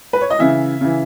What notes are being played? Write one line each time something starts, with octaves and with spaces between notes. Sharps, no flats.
B4
C#5
D#5
C#3 E3 E5
C#3 E3